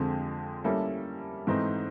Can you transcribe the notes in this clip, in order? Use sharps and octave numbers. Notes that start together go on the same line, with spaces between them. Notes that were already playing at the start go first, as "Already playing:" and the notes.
Already playing: F2 D3 F3 G#3 C4
G3 A#3 C#4 E4 A4
G#2 E3 A3 C4 D#4